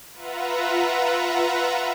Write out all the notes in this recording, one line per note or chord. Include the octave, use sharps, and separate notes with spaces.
F4 B4 E5 F#5 A#5